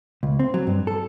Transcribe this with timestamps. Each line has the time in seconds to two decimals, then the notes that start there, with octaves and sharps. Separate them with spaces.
0.23 C#2
0.39 C4
0.54 F#3
0.67 G2
0.87 A4